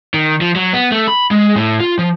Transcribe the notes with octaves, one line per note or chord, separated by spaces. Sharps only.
D#3
F3
F#3
B3
A3
B5
G#3
A2
F4
F3